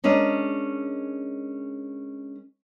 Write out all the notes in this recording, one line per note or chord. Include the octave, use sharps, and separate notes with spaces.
G#3 C#4 D4 A#4 D#5